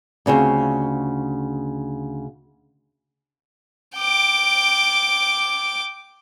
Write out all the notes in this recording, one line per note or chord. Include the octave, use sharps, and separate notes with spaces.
D2 C#3 C4 F4
G5 D6